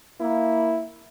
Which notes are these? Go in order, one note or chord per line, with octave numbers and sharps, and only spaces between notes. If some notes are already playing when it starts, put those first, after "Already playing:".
A#3 E4